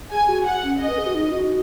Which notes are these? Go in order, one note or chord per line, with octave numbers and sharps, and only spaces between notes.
G#4 G#5
F#4
F#5
C#4
C#4 D#5
B4
G#4
F#4
D#4
F#4